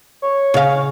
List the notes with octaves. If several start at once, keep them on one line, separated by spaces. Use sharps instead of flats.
C#5
C#3 F5